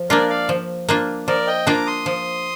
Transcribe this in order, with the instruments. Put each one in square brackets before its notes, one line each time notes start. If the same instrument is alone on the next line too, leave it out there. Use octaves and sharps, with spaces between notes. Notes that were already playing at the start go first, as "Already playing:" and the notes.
Already playing: [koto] F3
[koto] A#3 D4 F4 [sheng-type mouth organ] A#4 D5
[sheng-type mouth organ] D5 F5
[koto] F3
A#3 D4 F4
[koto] F3 [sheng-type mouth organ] A#4 D5
[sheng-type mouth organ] D#5 G5
[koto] A#3 D4 F4 [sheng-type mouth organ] A#5 D6
[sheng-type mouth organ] C6 D#6
[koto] F3